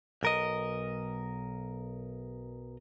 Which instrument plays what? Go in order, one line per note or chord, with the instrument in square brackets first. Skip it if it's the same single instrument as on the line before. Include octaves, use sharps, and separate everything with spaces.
[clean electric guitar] B1 A#4 D#5